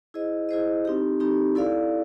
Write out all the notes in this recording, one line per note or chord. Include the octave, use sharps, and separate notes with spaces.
E4 G#4 C5 D#5
E4 G#4 C5 D#5
C4 D#4 G4
C4 D#4 G4
E4 A4 D5 F5